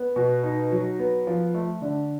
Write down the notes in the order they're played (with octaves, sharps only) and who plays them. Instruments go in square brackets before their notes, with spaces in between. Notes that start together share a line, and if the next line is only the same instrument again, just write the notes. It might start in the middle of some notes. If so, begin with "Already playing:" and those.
Already playing: [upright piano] B3
B2
D#4
F#3
B3
F3
A3
D3